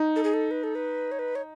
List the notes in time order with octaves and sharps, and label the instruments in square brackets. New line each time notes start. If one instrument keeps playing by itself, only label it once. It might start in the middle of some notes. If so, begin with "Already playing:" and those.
Already playing: [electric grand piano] D#4
[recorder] A4
G#4
A4
B4
A4
B4
C#5
B4
C#5